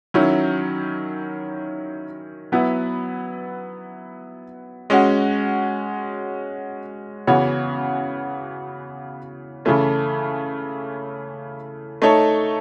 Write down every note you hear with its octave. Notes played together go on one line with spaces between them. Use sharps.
D#3 F#3 C#4 E4
F#3 B3 E4 B4
G#3 C#4 F#4
C#3 E3 B3 F#4 C#5
C#3 E3 A3 C#4
A3 D#4 A4 C#5